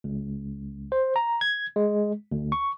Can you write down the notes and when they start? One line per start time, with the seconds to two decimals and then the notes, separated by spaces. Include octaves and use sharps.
0.04 C#2
0.92 C5
1.16 A#5
1.41 G#6
1.76 G#3
2.32 D2
2.52 C#6